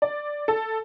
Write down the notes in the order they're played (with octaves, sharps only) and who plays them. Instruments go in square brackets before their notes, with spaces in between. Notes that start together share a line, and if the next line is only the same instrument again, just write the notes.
[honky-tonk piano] D5
A4